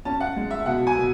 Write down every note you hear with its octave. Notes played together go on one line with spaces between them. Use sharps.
C#4 A5
F#5
G#3
E5
B2 F#5
G#5
B2